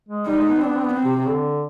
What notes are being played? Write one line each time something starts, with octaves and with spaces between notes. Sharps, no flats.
G#3
G3 D#4
G#3
B3
C4 D4
B3
C4
B3
C4
C3
C3
D3